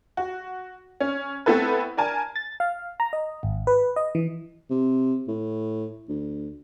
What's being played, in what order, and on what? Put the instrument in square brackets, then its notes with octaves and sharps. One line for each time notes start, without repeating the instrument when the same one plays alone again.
[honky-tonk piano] F#4
C#4
A3 B3 C4 E4 A4 B4
D4 A#4 G#5 A5
[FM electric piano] A6
F5
A#5
D#5
G#1
B4
D#5
E3
[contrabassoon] C3
A2
D2